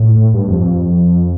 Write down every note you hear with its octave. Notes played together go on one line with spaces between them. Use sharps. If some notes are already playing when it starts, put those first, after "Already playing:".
Already playing: A2
G2
F2
F2